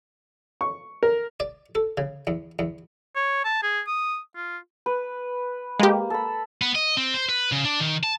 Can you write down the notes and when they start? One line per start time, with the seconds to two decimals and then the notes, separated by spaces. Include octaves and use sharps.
0.61 C#6
1.03 A#4
1.40 D5
1.75 A4
1.98 C#3
2.27 E2
2.59 E2
3.15 C#5
3.45 A5
3.63 G#4
3.87 D#6
4.36 F4
4.86 B4
5.80 G#3 A#3 G4
6.10 A4 B5
6.62 B3
6.75 D#5
6.97 C4
7.14 C5
7.29 B4
7.52 C#3
7.65 D4
7.80 D#3
8.03 A5